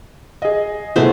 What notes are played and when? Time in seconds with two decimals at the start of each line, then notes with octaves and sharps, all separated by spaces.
0.42 G#4 D#5
0.96 C2 A3 B3 E4 G#4 C5